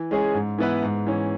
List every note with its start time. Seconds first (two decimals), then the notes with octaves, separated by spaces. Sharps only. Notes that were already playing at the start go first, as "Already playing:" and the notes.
Already playing: E3
0.11 G#3 C#4 G#4
0.34 G#2
0.58 E3 B3 E4 B4
0.83 G#2
1.06 E3 C#4